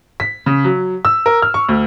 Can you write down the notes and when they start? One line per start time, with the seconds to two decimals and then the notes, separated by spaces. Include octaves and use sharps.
0.20 B6
0.46 C#3
0.64 F#3
1.05 E6
1.26 A#4
1.42 F6
1.54 C#6
1.69 D2